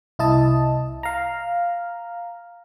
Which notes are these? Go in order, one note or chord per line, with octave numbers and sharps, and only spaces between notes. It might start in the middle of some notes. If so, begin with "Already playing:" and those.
C2 E4 D#5 A5
F5 A#5